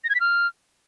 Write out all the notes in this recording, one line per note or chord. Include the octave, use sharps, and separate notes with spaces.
A#6
G#6
B6
F6